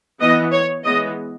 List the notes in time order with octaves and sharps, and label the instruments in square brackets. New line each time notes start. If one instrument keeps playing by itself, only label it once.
[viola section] E3 B3 D#5
C#5
E3 G#3 B3 D#5